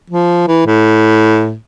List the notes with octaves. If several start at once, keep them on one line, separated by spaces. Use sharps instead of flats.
F3
E3
A2